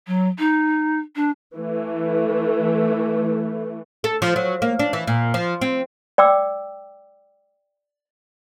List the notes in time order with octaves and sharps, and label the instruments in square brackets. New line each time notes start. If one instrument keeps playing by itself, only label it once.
[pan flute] F#3
D#4
D4
[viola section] E3 A3
[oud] A4
F3
F#3
A#3
D4
E3
A#2
F3
C4
[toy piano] D5 G5 D6 E6